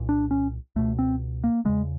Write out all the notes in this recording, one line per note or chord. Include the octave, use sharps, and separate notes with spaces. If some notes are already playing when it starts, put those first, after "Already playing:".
Already playing: C2 A#2
D4
C#4
C#2 B2 A3
C4
A#3
E2 C#3 G#3